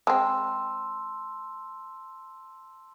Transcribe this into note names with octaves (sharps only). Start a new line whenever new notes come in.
G#3 C4 A5 C6 E6